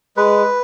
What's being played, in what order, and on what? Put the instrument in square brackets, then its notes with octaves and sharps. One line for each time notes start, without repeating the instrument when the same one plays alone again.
[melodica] G#3 B4